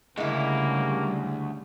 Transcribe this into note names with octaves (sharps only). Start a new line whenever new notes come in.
D2 C#3 G3 G#3 A#3 E4